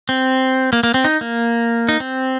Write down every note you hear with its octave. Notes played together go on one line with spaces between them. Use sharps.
C4
A#3
A#3
C4
D#4
A#3
D#4
C4